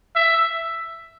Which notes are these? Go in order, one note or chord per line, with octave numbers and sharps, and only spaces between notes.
E5